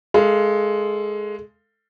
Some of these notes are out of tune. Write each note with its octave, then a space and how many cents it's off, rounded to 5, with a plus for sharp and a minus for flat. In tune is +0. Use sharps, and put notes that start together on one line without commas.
G#3 +10 A4 +15 F5 -20